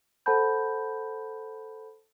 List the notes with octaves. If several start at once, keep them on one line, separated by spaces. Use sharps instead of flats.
A4 C5 F#5 A5 B5 G6